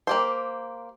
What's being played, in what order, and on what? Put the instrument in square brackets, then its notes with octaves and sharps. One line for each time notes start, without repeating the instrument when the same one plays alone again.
[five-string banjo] A#3 G4 C5